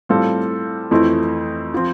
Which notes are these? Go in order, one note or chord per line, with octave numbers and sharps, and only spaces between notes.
A2 G3 C4 F4 A4
F2 E3 A3 C4 E4
F3 C4